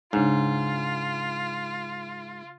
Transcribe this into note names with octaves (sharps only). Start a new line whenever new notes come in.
G#2 C#3 D4 D#4 F4